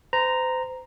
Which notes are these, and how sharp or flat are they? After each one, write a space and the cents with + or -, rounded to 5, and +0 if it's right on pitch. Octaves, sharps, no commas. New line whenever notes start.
C5 -35 A#5 +0